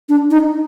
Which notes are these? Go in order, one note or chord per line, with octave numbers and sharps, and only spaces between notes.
D4
D#4